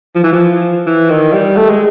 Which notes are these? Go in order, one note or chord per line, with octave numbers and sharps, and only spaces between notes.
F3
E3
F3
E3
D#3
G3
A3
G#3